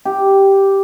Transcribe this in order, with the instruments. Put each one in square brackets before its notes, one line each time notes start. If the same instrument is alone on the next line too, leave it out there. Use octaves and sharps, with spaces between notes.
[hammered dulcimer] G4